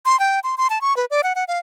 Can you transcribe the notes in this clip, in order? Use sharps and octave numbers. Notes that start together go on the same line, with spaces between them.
C6
G5
C6
C6
A5
C#6
B4
D5
F#5
F#5
F5